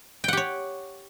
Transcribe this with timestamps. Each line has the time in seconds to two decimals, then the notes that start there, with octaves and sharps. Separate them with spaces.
0.24 G5
0.28 F#5
0.33 G4
0.37 C#5